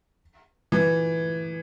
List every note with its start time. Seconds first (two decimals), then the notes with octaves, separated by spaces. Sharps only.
0.72 E3